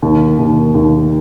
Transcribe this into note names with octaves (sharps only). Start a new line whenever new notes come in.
D#2
D#2
D#2